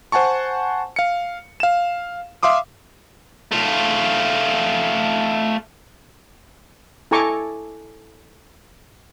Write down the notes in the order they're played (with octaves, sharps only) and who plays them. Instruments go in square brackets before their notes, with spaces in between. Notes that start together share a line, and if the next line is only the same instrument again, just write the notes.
[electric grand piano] C5 F#5 G#5 A5 C#6
F5 C#7
F5 E7
E5 F5 C6 D6 D#6
[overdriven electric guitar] A3 F4
[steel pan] E4 A4 G#5 A#5 C#6 D6